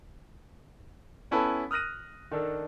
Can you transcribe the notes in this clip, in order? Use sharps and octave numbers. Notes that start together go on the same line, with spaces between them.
B3 C#4 E4 A4 B4 A5
D#6 F6 F#6 A#6 D#7
D#3 D4 A4